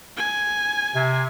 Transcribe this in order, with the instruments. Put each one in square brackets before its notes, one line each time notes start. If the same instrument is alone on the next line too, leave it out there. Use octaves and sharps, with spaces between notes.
[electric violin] G#5
[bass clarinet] C3